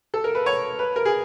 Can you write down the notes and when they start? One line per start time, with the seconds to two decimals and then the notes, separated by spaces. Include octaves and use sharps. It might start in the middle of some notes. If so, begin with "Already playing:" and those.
0.14 A4
0.24 A#4
0.35 B4
0.46 C#5
0.79 B4
0.96 A#4
1.05 G#4